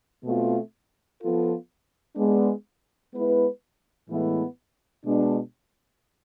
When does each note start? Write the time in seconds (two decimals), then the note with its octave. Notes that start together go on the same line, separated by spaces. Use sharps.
0.23 B2 A3 C4 F4
1.21 F3 B3 F4 A4
2.16 G#3 B3 D4
3.13 G#3 B3 E4 B4
4.10 A2 E3 G#3 B3 E4
5.06 B2 G#3 B3 D4